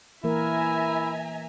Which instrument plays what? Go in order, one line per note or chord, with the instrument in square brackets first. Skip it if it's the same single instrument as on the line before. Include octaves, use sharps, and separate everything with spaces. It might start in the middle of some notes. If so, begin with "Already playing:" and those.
[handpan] E3 A#3 A#4 [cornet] E4 [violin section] E5 G#5 A#5